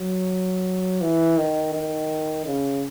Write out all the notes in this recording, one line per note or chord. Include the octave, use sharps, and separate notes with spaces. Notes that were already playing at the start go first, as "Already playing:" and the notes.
Already playing: F#3
E3
D#3
D#3
C#3